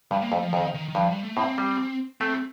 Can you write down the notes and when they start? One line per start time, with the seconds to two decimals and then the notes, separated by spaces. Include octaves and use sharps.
0.11 G2 G3
0.22 A#3
0.32 F2 A3
0.42 F3
0.52 F2 D#3
0.74 D#3
0.88 D#3
0.95 G2 F3
1.08 G3
1.23 A3
1.36 A2 C4
1.58 G3
2.21 A3 C4